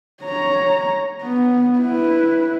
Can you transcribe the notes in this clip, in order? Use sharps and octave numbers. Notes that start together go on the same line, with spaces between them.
C#5 A#5
B3
E4 B4